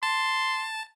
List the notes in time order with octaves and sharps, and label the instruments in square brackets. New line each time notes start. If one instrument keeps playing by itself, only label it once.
[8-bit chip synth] A5 [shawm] C6